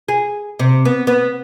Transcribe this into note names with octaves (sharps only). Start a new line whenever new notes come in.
G#4
C3
B3
B3